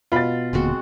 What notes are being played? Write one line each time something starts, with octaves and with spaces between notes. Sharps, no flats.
B2 F4 B5 A6
D#1 D3 G#3 A#3 C4 F#4